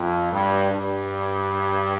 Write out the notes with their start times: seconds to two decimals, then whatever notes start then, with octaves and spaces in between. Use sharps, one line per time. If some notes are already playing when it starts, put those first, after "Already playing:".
Already playing: F2
0.32 G2
0.71 G2